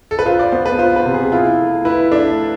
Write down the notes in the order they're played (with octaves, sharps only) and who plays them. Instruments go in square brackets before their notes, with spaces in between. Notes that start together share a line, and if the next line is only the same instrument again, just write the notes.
[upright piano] A4
B4
[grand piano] F4 [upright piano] C5
[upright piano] D5
[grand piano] B3 [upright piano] C5
[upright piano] B4
[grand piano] F4 [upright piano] C5
[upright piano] B4
[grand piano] C3
[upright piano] G#4
[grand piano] E4 [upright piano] F4
[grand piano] A3
[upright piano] E4 [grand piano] B4
[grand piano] A3 [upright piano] D4